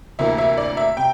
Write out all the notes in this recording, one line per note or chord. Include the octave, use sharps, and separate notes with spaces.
D2 C3 E3 A#3 E5
E5
D5
E5
C3 G5